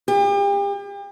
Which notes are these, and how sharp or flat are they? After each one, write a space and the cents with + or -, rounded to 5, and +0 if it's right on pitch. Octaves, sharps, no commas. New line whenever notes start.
G4 +40